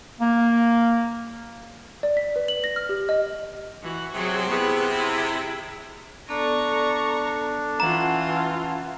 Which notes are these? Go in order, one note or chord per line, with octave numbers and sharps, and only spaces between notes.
A#3
D5
B6
B4
F#7
A#6
F6
G4
D#5
E3 F#4
C3 F#3 G#4
B3 E4 G#4
E4
B3 D4 A4 D5 A#5 C#6
E3 C#4 F4 F#5 A5 A#5